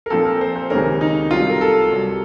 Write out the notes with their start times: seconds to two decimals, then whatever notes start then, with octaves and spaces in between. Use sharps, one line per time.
0.06 A#4
0.10 A#2 F3 C4 A4
0.25 A#4
0.41 C5
0.56 C5
0.70 C#2 C3 D#3 A#3 C#4 A#4
1.01 D#4
1.31 C2 C3 F#3 C4 F4
1.50 A#4
1.61 A4
1.91 C2 C3 F#3